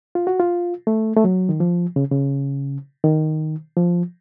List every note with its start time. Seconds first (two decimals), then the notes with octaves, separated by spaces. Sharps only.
0.15 F4
0.27 F#4
0.40 F4
0.87 A3
1.16 A3
1.24 F#3
1.49 D#3
1.60 F3
1.96 C#3
2.11 C#3
3.04 D#3
3.77 F3